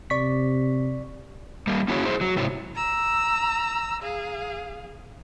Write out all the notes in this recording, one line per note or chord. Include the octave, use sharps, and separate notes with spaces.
C3 D5 C#6 B6
G3 A#3
A#3 C#4 E4 F#4 G#4 C#5
E4 G#4 C5
F#3
G#2 C3 E4 C#5
A#5 E6
G#4 F5